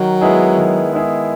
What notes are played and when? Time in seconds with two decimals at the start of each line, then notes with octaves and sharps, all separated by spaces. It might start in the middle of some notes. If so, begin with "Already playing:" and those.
Already playing: D#3 F#3
0.21 G#3 B3 E4 G#4
0.57 D#3
0.93 G#3 B3 E4 G#4